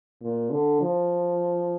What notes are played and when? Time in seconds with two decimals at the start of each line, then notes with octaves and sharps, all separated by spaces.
0.22 A#2
0.51 D3
0.81 F3